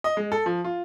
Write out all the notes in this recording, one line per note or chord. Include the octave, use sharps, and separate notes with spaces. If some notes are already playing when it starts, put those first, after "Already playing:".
D#5
G#3
A4
F3
F4